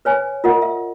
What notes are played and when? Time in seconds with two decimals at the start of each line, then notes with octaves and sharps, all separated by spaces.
0.05 B4 C#5 G#5
0.44 F4 A#4 D#5 F#5
0.62 E5